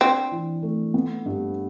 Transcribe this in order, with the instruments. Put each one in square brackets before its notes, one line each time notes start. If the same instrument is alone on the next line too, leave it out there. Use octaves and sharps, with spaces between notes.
[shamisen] C4 [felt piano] D4
[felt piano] E3
A3
B3
G2